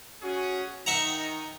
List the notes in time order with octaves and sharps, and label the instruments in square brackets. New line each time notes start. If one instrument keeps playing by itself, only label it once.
[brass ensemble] C#4 F#4 G#4
[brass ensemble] D#3 D#4 [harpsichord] E5 F#5 A#5